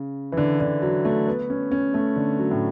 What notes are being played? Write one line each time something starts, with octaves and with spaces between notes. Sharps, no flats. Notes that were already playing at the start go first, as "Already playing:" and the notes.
Already playing: C#3
E3
D3
D3
F#3
A3
B3
C#4
C#4
A3
D3
F#3
A2